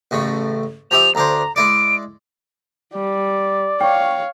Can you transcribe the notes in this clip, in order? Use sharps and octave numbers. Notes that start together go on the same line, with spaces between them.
A1 A2 C#3
F3 G4 E5 F7
D2 D4 C5 A#5
G#3 E4 D5 D7
G3 D5
C#5 F5 G5 C#6